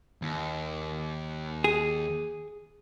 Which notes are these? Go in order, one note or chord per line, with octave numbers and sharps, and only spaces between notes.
D#2
G#4